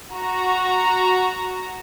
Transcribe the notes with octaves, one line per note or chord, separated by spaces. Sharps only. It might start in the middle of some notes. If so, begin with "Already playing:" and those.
F#4 A#5